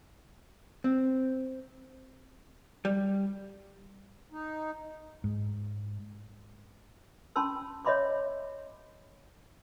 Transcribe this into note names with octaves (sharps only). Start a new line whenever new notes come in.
C4
G3
D#4
G#2
C#4 G#5 A5 B5 C6 E6
C#5 D#5 E5 B5 C6 D6